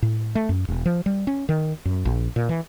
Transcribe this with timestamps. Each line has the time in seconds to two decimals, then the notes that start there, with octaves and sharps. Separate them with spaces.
0.02 A2
0.35 A3
0.49 F#2
0.68 E1
0.86 F3
1.06 G3
1.27 C#4
1.49 D#3
1.85 F#2
2.05 A#1
2.36 A#2
2.49 E3